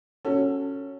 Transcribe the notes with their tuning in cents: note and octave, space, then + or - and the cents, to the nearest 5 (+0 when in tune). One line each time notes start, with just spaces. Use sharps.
C#4 +0 F#4 +0 A4 +20